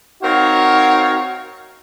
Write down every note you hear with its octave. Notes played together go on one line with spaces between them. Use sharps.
C4 D#4 F#4 A#4 C#5 F5